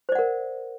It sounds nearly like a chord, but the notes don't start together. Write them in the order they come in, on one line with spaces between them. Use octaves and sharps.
C5 D5 F#5 A#4